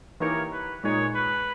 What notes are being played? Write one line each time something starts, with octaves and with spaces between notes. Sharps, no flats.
E3 A#3 D#4 G4 A#4 C#5
B4
A#2 G#3 D#4 G#4 C#5
B4